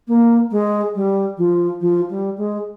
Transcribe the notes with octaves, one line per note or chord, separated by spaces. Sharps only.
A#3
G#3
G3
F3
F3
G3
G#3